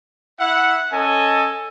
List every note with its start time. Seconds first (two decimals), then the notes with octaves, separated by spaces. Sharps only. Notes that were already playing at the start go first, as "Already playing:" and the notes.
0.40 E4 E5 F#5
0.92 C#4 A4 D#5 G#5